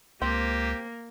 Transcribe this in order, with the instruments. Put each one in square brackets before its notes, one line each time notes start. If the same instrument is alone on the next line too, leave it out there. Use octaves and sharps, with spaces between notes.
[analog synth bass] C#2 [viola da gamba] A#3 [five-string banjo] C4 [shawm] G4